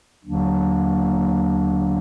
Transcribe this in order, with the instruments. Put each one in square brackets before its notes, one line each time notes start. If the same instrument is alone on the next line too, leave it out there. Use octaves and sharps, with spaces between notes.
[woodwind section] D#2 D3 F#3 A#3 D4